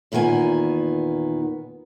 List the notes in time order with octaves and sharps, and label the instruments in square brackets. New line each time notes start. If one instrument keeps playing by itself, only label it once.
[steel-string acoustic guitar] E2 A#2 D#3 B3 G#5